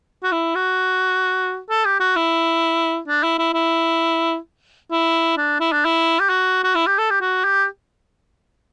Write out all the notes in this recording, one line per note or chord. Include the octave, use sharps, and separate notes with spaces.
F#4
E4
F#4
A4
G4
F#4
E4
D4
E4
E4
E4
E4
D4
E4
D4
E4
G4
F#4
F#4
E4
G4
A4
G4
F#4
G4